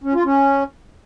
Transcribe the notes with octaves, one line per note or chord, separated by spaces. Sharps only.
C#4
F4
C#4